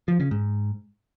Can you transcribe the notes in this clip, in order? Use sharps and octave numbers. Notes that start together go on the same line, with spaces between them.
F3
C#3
G#2